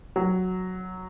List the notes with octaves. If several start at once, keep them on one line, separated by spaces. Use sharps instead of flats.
F#3